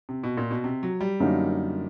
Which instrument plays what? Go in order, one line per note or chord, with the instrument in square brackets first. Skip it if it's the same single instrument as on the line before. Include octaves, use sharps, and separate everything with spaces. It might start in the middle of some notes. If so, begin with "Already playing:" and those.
[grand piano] C3
B2
A#2
B2
C3
F#3
G3
[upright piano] F#2 D3 F#3 A#3 D#4